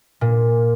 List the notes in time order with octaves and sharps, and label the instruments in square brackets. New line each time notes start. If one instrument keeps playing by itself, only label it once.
[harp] A#2